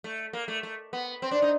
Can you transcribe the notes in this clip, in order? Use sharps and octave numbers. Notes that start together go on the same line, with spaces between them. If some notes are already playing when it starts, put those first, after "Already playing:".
A3
A#3
A3
A3
B3
C4
D4
D#4